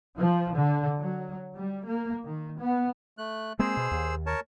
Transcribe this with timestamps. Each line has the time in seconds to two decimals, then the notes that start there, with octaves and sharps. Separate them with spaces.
0.18 F3
0.54 D3
0.98 F#3
1.55 G3
1.86 A#3
2.25 D#3
2.58 B3
3.18 A3 F#6
3.59 G#3 A#3 C4 G#4 C5 E6
3.77 B2
3.91 D#2
4.26 A#4 C#5 A5